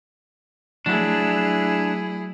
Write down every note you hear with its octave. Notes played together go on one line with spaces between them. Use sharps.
F#3 A3 D4 E4 G#4